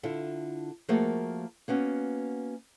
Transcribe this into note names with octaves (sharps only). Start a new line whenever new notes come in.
D3 E4 F4 A4
F3 A3 A#3 F#4 G#4 A#4
A#3 B3 C#4 F#4